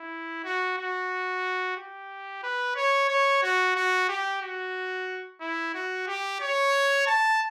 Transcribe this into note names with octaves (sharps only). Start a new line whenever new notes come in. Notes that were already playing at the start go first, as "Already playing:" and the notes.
Already playing: E4
F#4
F#4
G4
B4
C#5
C#5
F#4
F#4
G4
F#4
E4
F#4
G4
C#5
A5